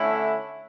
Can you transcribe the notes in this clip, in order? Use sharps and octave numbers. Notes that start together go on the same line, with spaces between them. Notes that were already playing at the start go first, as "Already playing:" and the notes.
Already playing: D3 A3 C#4 E4